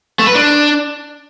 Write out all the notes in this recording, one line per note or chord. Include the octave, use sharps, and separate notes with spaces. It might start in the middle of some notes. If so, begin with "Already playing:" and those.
A3
B4
D4